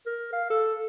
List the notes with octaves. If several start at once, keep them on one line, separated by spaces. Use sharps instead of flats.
A#4
F5
A4